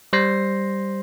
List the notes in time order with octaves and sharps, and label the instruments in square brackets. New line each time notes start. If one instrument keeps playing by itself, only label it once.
[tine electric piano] G3 C5 A#6 C7